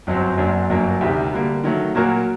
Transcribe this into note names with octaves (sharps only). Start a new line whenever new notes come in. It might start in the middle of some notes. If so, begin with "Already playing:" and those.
G1 F#2 F#3 C4
F#1 F#2 F#3 A#3 D4
G1 F#2 F#3 A#3 D4
D2 C3 D#3 G3
D3 G3 A#3
D#3 F#3 A3
A#2 F#3 A#3 F#4 A#4